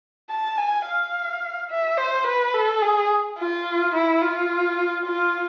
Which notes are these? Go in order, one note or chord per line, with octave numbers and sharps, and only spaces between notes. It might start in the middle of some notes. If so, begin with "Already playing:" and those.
A5
G#5
F5
E5
C5
B4
A4
G#4
F4
E4
F4
F4